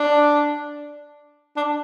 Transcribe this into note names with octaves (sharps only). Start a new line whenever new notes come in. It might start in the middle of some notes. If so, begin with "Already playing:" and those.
Already playing: D4
D4